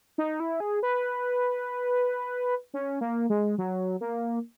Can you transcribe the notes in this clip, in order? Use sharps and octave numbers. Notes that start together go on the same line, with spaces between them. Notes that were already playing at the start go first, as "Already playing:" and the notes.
D#4
E4
G#4
B4
C#4
A#3
G#3
F#3
A#3